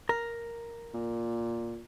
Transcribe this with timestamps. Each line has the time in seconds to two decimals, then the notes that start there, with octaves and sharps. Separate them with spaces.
0.09 A#4
0.94 A#2